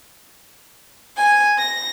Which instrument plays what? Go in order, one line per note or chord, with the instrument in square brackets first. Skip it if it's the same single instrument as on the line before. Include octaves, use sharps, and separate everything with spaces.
[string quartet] G#5
A#6